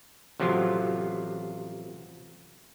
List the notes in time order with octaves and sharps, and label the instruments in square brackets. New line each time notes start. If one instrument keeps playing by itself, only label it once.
[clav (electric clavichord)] A1 C3 F3 F#3 F4